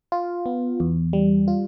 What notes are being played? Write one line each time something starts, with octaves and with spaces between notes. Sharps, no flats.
F4
B3
E2
G3
F4